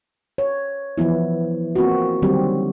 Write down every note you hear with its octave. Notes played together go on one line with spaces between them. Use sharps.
C#5
E3 F3 B3 E4
A#3 C4 F4 F#4
D3 D#3 F#3 G3 C4 G4